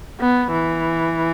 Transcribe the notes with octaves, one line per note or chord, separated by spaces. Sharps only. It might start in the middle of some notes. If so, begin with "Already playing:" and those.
B3
E3